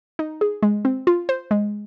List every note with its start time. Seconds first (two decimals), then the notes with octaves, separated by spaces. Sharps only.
0.19 D#4
0.41 G#4
0.63 G#3
0.85 C4
1.07 F4
1.29 C5
1.51 G#3